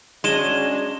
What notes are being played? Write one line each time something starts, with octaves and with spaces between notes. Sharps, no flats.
F#3 G#3 C#4 D4 C6 E7 G7